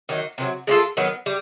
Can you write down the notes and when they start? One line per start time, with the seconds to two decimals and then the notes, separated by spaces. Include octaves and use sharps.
0.09 D#3 F#3 A#3 D#4
0.38 C3 D#3 F#3
0.67 G#3 C#4 F4 A4
0.97 D#3 F#3 B3
1.26 G3